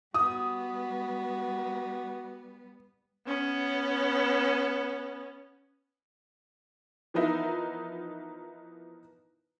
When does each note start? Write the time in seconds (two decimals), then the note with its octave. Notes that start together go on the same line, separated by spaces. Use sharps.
0.14 G3 B3 F#4 D#6
3.27 B3 C#4
7.14 E3 F3 B3 D#4 A#4 E5